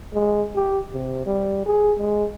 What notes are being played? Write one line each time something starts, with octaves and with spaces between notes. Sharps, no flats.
G#3
G4
C3
G3
G#4
G#3